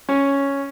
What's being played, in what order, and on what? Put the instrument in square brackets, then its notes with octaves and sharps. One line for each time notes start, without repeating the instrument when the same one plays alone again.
[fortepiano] C#4